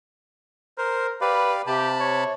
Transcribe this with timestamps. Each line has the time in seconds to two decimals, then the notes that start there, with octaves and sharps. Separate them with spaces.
0.78 A#4 C5
1.21 G4 B4 D5 F5
1.67 C3 G4 A5 B5
2.00 C#5